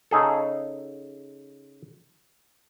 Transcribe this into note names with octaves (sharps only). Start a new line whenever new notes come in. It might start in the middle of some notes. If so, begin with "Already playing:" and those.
C#3 D#4 G#4 A4